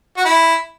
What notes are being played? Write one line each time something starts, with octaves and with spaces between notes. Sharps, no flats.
F#4
E4